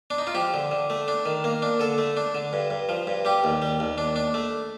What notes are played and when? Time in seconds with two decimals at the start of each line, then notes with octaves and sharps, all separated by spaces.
0.10 D4
0.18 D#4
0.27 F4
0.35 F3 G4
0.54 D3
0.71 D3
0.90 A3
1.08 D4
1.26 D#3
1.44 A#3
1.62 D4
1.80 D3 A4
1.98 A3
2.17 D4
2.35 D3
2.53 G2
2.70 G2
2.89 F3
3.07 G2
3.25 G3 G4
3.44 D#2
3.62 G3
3.80 D#2
3.98 D4
4.16 D4
4.34 A3